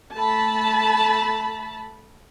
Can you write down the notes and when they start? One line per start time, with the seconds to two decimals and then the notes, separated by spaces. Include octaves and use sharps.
0.13 A3 A5 B5